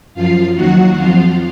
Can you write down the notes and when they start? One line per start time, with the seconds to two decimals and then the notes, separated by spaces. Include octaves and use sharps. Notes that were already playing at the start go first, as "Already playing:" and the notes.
0.14 F#2 F3 F4 F5
0.55 D#2 D#3 F#3 F#4 F#5
0.96 F2 F3 F4 F5